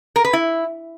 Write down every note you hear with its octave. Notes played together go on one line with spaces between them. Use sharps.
A#4
B4
E4